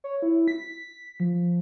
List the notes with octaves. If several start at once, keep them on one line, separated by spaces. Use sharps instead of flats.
C#5
E4
B6
F3